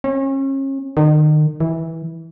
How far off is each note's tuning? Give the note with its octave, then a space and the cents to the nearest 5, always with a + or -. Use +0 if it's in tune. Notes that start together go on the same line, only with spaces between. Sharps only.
C#4 -35
D#3 -35
E3 -15